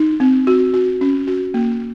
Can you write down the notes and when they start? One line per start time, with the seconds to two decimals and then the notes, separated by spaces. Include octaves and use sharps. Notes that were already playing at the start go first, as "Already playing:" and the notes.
Already playing: D#4
0.20 C4
0.47 F#4
0.74 F#4
1.01 C#4
1.27 F#4
1.54 A#3